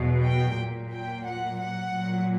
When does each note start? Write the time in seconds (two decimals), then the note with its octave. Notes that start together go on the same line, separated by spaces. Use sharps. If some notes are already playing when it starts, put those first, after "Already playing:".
Already playing: E2 B2 F#3
0.23 G5
0.57 A#2 F#3
0.91 G5
1.26 F#5
1.60 F#5
1.95 A#2 F#3